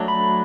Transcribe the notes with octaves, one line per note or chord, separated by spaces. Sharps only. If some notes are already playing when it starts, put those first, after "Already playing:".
Already playing: F#3 A3 D4
B5